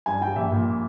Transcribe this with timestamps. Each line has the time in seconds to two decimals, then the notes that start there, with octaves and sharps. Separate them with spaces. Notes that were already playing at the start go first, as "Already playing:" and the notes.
0.06 G2 G#5
0.21 G3 G5
0.36 A#1 E5
0.51 A#2